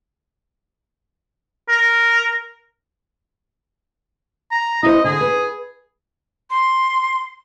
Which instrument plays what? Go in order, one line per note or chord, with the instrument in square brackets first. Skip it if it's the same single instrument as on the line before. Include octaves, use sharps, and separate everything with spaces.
[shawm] A#4
A#5
[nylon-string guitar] E4 C5 [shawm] D#5
[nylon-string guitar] D3 [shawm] G#4
[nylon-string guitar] B4
[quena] C6